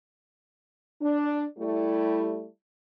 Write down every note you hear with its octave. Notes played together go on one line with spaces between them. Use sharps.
D4
G3 A3 E4